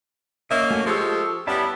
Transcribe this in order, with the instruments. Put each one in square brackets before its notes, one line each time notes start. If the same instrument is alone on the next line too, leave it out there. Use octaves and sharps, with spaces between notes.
[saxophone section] A#3 C#4 [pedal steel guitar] D#5 E5
[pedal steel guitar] A3 F#4 G#5
[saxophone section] F3 G#3 G4 [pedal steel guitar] A4 C#6 E6
[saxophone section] G3 B3 C#4 [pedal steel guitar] E4 D5 A5